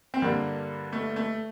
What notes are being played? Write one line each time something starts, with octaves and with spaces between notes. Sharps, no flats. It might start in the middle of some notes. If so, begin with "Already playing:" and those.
C4
G2 D3 G3 A#3
A3
A3